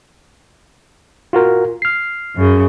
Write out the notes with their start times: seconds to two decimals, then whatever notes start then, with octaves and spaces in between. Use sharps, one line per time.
1.33 F4 F#4 A#4
1.82 F6 C7
2.35 F#2 C#3